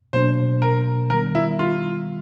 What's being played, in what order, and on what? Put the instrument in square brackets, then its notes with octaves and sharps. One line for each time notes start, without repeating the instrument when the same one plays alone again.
[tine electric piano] B2 F#3 A#3 D4 [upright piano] C5
[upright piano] A#4
[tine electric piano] D#3 G3 B3 [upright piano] A#4
[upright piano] E4
F4